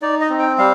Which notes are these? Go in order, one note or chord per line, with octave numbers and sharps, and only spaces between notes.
D#4 D5
D#5
C4
G5
G3 F5